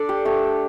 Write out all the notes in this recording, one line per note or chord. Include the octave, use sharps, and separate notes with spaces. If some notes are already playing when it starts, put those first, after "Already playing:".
Already playing: D4 A4 D5
G4
A3 D4 G4